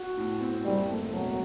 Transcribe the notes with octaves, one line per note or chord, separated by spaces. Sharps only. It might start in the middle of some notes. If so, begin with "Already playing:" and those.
Already playing: F#4
A2
C4
F#1 G3
A3
E1 F#3